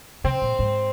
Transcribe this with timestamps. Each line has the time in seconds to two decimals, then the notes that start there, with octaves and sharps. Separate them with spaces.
0.24 C3 C4
0.42 A#2
0.59 G#2